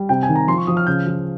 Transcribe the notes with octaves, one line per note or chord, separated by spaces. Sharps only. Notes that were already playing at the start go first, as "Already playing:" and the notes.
Already playing: G3
C3 G5
G#5
D#3
A#5
F3 C6
C#6
F3 D#6
F6
C#3 G6
F3